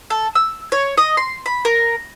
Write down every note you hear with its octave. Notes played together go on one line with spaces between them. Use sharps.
A4
E6
C#5
D#5
C6
B5
A#4